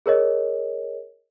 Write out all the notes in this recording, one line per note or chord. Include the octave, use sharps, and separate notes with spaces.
G#4 A#4 C#5 D#5